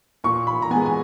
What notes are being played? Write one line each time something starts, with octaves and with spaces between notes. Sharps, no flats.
A#2 C#6
B5
A#5
G#3 B3 G#5
G#5